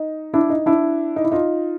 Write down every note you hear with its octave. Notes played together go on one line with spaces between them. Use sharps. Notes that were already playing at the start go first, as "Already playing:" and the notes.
Already playing: D#4
D4 E4
D#4
D4 E4
D#4
E4
D#4 F4